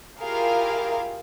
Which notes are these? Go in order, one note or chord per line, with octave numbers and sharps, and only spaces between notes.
E4 F4 G4 G#4 A#4 F5